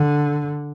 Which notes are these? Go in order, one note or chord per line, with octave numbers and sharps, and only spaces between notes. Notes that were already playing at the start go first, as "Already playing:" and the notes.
Already playing: D3